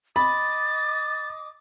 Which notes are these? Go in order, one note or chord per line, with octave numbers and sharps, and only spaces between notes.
D#5 B5 D6 D#6 A6